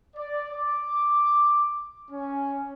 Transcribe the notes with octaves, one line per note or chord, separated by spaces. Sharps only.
D5
D6
C#4